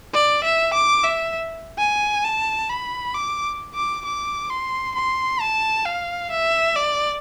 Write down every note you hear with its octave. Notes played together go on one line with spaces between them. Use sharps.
D5
E5
D6
E5
G#5
A5
B5
D6
D6
D6
C6
C6
A5
F5
E5
D5